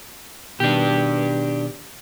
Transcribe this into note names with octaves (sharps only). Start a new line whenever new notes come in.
B2 D#3 D4 G4